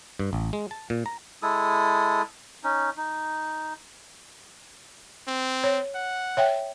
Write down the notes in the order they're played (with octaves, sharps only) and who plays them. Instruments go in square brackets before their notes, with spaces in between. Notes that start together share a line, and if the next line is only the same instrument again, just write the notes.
[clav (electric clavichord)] G2
A1
G#3
A5
A#2
A#5
[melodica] G#3 E4 A4 D#6
C#4 D#4
D#4
[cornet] C4
[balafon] C#5
[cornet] F#5
[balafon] C#5 E5 G5